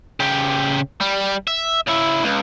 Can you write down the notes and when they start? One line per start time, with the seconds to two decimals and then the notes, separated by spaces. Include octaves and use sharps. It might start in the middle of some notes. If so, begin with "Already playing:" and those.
0.20 C#3 G4
1.01 G3
1.47 E5
1.87 C#3 E4
2.23 C#2